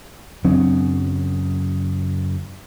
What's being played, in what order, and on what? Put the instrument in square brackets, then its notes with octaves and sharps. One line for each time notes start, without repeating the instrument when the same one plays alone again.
[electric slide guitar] F#2 C#3 [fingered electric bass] F#3 C4 D4